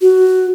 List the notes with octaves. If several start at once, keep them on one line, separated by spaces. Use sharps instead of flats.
F#4